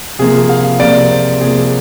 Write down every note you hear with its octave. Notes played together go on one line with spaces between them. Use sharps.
C3 F3 A#3 G#4
F5
C3 F3 A#3 D5
C5
C3 F3 A#3 G#4